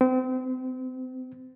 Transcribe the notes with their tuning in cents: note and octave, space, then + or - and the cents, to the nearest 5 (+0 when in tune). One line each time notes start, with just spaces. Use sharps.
C4 -35